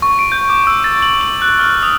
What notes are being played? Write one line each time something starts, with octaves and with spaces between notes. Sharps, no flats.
C#6
D7
G6
D6
E6
A6
F#7
F#7
F#6
F6
D#6